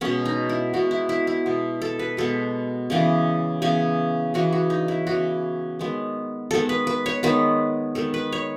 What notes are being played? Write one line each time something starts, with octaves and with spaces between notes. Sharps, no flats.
B2 G#3 B3 C#4
D#4
E4
B2 G#3 B3 F#4
E4
E4
E4
B2 G#3 B3
A4
B4
B2 G#3 B3 A4
C#3 E3 B3
C#3 E3 B3 G#4
C#3 E3 B3 F#4
F#4
D#4
E4
C#3 E3 B3 F#4
D#3 G#3 B3
D#3 G#3 B3 A4
B4
B4
C#5
D#3 G#3 B3 B4
D#3 G#3 B3 A4
B4
C#5